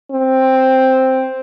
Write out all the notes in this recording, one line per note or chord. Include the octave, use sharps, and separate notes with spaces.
C4